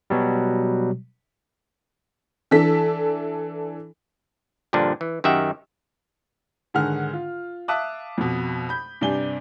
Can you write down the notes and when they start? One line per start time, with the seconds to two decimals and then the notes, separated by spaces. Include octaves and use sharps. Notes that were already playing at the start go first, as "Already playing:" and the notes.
0.10 B2 F#3 G3
2.51 E3 D4 A4 B6
4.73 G2 A#2 D3 F3 D4
5.01 E3
5.24 F#2 D#3 G4 E5 F#5
6.74 G#2 D3 D#3 G#4 F#5 F6
7.13 F4
7.68 E5 F5 A5 D6 D#6 F#6
8.17 F2 B2
8.69 B5 G6
9.01 G2 C3 D4 G#5 G7